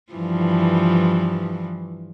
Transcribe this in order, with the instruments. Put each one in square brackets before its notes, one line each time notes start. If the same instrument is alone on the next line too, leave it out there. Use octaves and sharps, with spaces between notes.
[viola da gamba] G2 E3 F3